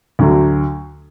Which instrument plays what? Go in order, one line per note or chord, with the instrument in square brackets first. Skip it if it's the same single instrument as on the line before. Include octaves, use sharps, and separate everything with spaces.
[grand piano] D2 D3 F#3